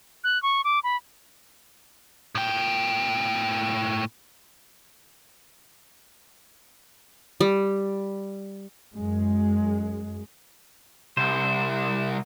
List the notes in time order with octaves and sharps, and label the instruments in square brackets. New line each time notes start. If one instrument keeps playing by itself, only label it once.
[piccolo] F#6
C#6
D6
B5
[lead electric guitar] A2 G5
[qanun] G3
[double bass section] F#2 G#3
[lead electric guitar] C2 [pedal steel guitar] C5